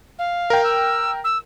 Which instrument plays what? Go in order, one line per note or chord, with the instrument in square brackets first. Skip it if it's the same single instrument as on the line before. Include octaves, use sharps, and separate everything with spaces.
[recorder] F5
[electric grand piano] A#4 G5
[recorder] E6
E6